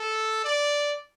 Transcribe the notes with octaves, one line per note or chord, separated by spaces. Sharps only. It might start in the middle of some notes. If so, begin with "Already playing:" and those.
Already playing: A4
D5